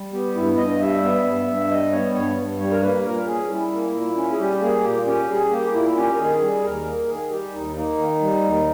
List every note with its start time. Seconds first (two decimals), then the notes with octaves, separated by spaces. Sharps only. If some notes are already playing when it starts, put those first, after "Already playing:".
Already playing: G3
0.13 B3 G4
0.35 G2 E4
0.57 G2 D#5
0.80 G3 E5
1.03 B3
1.25 G2
1.47 G2
1.70 G3 D#5
1.92 B3 C#5
2.15 G2 C#5
2.37 G2
2.59 G3 C#5
2.71 A#4
2.82 A#3 B4
3.04 A#2 A#4
3.27 C#4 G#4
3.49 G3 E4
3.72 A#3
3.94 A#2
4.16 C#4
4.32 G#4
4.39 G3 G4
4.61 A#3 G#4
4.84 A#2 G4
5.06 C#4 G4
5.29 G3 G#4
5.51 A#3 G4
5.74 A#2 E4
5.97 C#4 G4
6.13 A#4
6.19 D#3 G#4
6.41 G3
6.63 D#2 A#4
6.86 A#3
7.08 D#3 G#4
7.31 G3 G4
7.53 D#2 D#4
7.76 A#3 D#4
7.98 D#3
8.21 G3
8.43 D#2